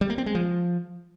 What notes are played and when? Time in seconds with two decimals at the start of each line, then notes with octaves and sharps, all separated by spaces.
0.01 G3
0.10 A#3
0.18 C4
0.26 G#3
0.35 F3